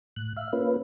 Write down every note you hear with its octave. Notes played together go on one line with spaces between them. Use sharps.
A2 F#6
E5 F5
A#3 C#4 F4 B4